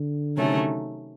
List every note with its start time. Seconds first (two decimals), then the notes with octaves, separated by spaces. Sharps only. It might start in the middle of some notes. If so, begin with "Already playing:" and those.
Already playing: D3
0.37 C3 D#3 F#3 A3 C#4